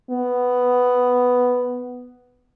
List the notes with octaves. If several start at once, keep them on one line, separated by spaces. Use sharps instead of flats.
B3